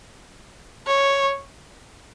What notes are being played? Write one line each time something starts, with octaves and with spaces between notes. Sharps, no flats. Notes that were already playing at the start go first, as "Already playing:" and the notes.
C#5